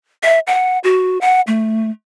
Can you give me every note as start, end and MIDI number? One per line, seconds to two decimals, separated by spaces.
0.23 0.39 76
0.47 0.78 78
0.84 1.18 66
1.21 1.41 78
1.47 1.90 57